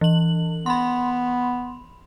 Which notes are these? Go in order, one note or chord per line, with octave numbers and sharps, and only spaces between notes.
E3 F#7
B3 B5 C6